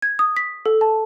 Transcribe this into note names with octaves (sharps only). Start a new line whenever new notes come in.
G#6
D#6
B6
A4
A5